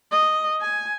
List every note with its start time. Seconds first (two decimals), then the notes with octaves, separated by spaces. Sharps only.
0.11 D#5
0.61 G#5